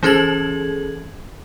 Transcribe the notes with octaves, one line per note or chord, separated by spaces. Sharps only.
E3 C#4 G#4 A4 G#6 F#7